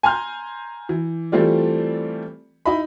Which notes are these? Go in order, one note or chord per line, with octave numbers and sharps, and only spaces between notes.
G#5 A#5 C6 F6 G6
E3
E3 G3 A3 C4 F4 D5
D#4 E4 D#5 B5